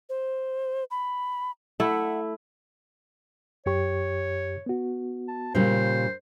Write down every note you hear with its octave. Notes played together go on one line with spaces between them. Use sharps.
C5
B5
A3 E4 F#5
F#2 G4 C#5 C#6
B3 F#4
A5
A#2 C#3 G3 C5